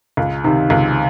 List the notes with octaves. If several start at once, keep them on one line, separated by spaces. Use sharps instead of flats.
C#2
C3 D#3
C#2